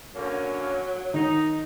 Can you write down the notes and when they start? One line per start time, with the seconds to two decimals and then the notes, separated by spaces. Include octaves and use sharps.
0.15 D3 F#3 A#3 C#4
1.14 D#3 D#4